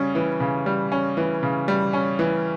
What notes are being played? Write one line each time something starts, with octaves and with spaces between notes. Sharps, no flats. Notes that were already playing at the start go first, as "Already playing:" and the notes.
Already playing: C#3 G3 C#4
E3
C#3
G3
C#4
E3
C#3
G3
C#4
E3